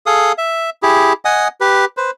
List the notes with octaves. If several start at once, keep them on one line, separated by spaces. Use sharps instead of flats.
G#4 A4 F5 D#6
E5
E4 G4 G#4
D#5 F#5 G#5 D#6
G4 B4
B4 C5